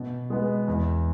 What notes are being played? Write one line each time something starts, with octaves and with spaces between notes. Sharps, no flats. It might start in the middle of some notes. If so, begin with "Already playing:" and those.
Already playing: B2
G#3 B3
E2